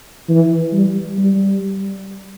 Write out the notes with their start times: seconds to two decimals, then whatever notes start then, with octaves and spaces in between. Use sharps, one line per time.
0.29 E3
0.73 G3
1.18 G3